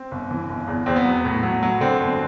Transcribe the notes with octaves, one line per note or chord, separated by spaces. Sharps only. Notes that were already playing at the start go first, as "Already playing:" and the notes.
Already playing: C4
G1
E3
G1
E2
E2 C4
B3
F#3
A2 B3
F#3
F#3
D3 C4
G1